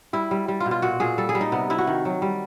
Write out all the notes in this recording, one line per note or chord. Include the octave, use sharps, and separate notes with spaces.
G3 E4
G3
G3
F4
B2
F4
A#2 F#4
A#2 G#4
G3 A4
G#4
G3
D#4
C3 B3
C3 E4
F#4
D#3
F#3
G3